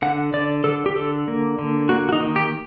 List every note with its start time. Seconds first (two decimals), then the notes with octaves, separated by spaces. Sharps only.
0.02 D3 F#5
0.34 D3 D5
0.64 D3 A4
0.86 G4
0.96 D3 A4
1.28 A#3
1.59 D3
1.89 A#3 F#4
2.09 F#4
2.12 D#4
2.20 D#3
2.36 G4